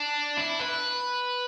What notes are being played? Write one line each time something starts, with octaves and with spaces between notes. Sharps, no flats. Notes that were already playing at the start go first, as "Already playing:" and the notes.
Already playing: D4
E4
B4